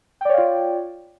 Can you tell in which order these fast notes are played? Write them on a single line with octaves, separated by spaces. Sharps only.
G5 D5 C#5 F5 F4